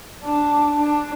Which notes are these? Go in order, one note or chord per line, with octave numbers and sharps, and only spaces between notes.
D4
D4